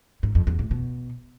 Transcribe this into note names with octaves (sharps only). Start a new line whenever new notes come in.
G#2
F2
E2
A2
B2